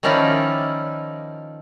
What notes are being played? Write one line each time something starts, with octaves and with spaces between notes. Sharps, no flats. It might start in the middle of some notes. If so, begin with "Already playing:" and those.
D#3 F3 C#4 D#4 E4 D5